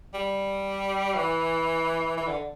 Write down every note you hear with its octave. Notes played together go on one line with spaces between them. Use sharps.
G3
E3
E3
D3